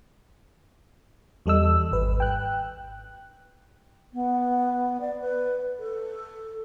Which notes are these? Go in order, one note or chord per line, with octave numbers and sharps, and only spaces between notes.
E2 G3 A4 D#5 E6
G#1 B4
G5 F#6
B3
D5
B4
A4